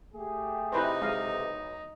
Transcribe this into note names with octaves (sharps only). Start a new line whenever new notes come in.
A3 G4 G#4
C3 D#4 E4 B4 C5
B1 G#3 D#5 F5